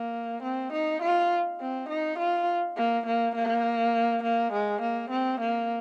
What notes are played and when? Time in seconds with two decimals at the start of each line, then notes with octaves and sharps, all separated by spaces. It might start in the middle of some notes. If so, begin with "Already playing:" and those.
Already playing: A#3
0.43 C4
0.73 D#4
1.02 F4
1.60 C4
1.89 D#4
2.19 F4
2.77 A#3
3.06 A#3
3.35 A#3
4.23 A#3
4.53 G#3
4.82 A#3
5.10 C4
5.40 A#3